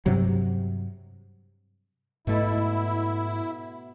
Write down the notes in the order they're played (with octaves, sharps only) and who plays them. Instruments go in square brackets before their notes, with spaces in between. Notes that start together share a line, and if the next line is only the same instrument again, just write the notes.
[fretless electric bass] G2 C3 F#3
[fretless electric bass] G#2 A3 [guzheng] B2 A4 [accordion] E4